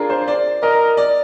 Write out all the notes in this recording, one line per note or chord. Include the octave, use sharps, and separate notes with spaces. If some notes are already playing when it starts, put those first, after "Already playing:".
Already playing: D4 F4 G#4 A#4
C5
D5
A#4 D#5
D5